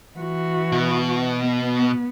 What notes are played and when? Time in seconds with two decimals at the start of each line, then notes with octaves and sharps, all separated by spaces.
0.17 E3 F#4
0.72 B2
1.43 B3